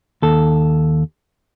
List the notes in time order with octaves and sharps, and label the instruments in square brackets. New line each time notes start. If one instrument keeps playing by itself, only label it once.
[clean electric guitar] D#2 A4